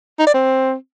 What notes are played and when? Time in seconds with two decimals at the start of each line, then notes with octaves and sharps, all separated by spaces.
0.19 D#4
0.27 D5
0.34 C4